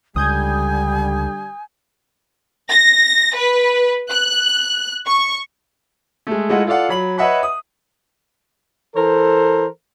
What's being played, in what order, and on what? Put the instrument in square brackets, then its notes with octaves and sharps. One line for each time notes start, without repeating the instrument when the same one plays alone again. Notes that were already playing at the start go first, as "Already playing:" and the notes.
[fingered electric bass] C#2 [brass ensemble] D3 G3 [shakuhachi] G#5 [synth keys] D#6 G6 G#6
[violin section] A#6
B4
F#6
C#6
[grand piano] G#3 A3
G#3 A3 E4 F4 D#5 F#5
F4 A4 D5 F5 F#5
F#3 B5 F#7
B4 C#5 D#5 E5 F#5 B5
D#6
[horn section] E3 A4 A#4 C5